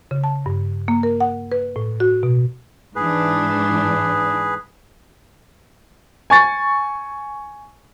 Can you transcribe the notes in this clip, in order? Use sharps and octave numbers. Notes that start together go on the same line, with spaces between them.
C#3
A5
G2
A#3
A#4
F#5
B4
A2
F#4
B2
G#2 E3 D4 G#4 B4
G#5 C#6 A6